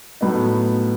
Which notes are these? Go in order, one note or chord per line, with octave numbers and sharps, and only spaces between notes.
A2 F#3 B3 D#4